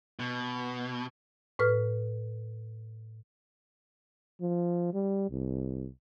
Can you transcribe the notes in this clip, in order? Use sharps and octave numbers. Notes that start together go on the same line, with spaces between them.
B2
A2 B4 F6
F3
G3
C2